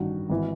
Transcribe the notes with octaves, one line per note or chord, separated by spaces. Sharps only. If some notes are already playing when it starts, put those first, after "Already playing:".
Already playing: A1 G2 D#3 F#4
G#1 E3